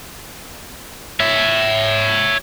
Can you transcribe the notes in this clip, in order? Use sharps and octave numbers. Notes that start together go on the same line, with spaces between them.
C#5 E5